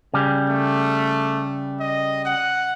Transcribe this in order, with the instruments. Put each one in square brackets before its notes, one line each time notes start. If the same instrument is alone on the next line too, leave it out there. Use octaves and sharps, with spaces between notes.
[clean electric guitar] C#3 G3
[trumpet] A3
D#5
F#5